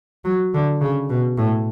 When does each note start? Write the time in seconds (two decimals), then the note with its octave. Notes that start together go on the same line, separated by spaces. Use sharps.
0.25 F#3
0.54 D3
0.81 C#3
1.10 B2
1.37 A2